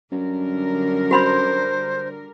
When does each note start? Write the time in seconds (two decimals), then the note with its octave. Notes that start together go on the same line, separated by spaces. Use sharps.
0.12 F#2 D3 G3 A#4
1.11 F#4 C5 B5 C6